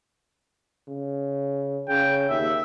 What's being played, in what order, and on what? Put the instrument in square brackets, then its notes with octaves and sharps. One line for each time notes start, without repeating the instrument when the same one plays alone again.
[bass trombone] C#3
[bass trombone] C#3 [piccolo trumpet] G5
[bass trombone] D#2 [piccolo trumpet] E5